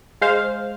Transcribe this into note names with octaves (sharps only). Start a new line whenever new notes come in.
G#3 C5 F5